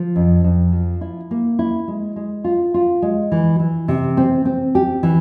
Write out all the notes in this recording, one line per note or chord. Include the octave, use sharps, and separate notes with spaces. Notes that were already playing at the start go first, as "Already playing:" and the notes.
Already playing: F3
F2
F2
F3
E4
A#3
E4
G#3
G#3
F4
F4
G#3
E3
E3
C3
C4
C4
G4
E3